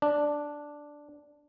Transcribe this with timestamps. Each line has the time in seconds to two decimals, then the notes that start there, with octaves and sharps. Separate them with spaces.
0.02 D4